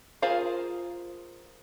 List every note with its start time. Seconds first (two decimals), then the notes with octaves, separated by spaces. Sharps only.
0.22 F4 G#4 A#4 C5 F5